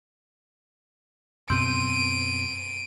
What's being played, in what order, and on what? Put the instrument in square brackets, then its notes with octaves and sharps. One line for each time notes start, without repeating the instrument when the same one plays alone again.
[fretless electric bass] F#2 B2 C4 [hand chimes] C6 E6 G6 [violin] D7 D#7